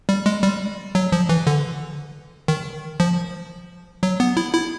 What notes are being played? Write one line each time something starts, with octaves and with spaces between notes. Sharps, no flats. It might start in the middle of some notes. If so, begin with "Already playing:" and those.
G3
G#3
G3
F#3
F3
E3
D3
D#3
F3
F#3
B3
E4
E4